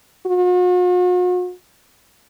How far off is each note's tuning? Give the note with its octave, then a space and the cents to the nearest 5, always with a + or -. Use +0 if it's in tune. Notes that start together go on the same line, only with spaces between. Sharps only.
F#4 -45